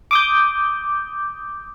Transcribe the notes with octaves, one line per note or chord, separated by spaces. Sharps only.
D6 D#6 G6